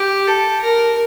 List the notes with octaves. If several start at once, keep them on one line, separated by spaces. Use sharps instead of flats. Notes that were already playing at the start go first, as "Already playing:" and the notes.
Already playing: G4
A4
A#4